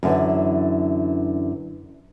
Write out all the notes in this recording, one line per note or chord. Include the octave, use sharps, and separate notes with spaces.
F#2 D3 E3